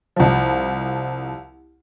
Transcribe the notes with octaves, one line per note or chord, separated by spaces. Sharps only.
C2 F3